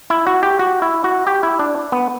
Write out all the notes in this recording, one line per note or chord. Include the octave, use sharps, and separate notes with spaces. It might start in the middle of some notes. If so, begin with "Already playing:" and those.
E4
F#4
G4
F#4
E4
F#4
G4
E4
D4
B3